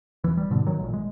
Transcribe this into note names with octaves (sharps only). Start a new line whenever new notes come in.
E1 E3
G3
G#2 B2 D3
D#3 F#3
A1 A#2
G#3